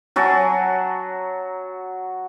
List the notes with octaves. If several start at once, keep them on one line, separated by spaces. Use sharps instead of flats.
F#3 F#4 G#5 A5